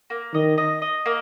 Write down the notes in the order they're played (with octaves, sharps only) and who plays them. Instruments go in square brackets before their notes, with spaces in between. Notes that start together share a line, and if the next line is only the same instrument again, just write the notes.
[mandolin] A#3
[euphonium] D#3 [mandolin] D#5
[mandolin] D#5
D#5
A#3